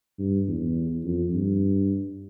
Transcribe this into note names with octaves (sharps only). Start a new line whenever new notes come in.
G2
E2
F2
G2